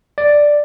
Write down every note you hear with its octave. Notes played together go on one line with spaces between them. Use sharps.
D5